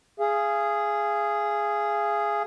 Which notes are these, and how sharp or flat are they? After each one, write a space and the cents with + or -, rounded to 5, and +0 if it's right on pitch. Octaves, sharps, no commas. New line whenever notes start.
G#4 +0 F5 -30